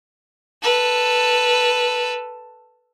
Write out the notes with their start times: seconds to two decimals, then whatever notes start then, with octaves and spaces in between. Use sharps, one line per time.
0.62 A4 B4